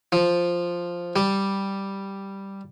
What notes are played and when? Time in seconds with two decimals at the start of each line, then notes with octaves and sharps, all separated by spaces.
0.12 F3
1.16 G3